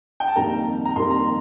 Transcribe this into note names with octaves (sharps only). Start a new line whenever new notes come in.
G5
A5
F2 D#3 G3 A#3 A#5
A#5
F2 D#3 G3 A#3 C6
A#5